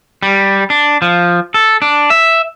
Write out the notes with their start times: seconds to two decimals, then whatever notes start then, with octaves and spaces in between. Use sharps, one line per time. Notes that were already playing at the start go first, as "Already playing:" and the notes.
0.23 G3
0.70 D4
1.02 F3
1.54 A4
1.82 D4
2.10 E5